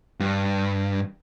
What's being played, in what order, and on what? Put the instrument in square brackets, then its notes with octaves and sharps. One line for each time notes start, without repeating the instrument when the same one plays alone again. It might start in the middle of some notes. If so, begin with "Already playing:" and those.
[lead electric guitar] G2